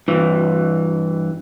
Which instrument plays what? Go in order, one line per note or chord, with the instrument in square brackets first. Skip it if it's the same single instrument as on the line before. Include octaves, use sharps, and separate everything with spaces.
[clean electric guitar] G2 E3